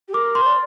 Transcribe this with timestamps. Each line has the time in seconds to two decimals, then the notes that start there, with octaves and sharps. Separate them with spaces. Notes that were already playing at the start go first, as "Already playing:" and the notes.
0.08 G4
0.13 A#4 D6
0.35 C6
0.41 C5
0.46 D5